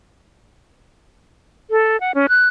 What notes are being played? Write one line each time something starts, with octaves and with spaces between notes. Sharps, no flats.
A4
F#5
C#4
F#6